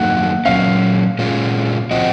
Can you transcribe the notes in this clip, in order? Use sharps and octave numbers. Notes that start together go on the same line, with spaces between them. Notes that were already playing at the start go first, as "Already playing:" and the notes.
Already playing: F#2 F#3 A#3 D#4 F#5
A#2 F#3 C#4 F5
A#2 G#3 C#4 F4
F3 C4 F#4 D#5